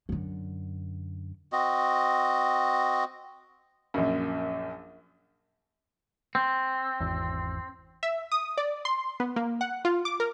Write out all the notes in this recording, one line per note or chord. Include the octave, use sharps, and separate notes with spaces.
F#2 D3
C4 F#4 D#5
A#1 F#2
C4
G#1 E2
E5
D#6
D5
C6
B3
A#3
F#5
F4
D6
A#4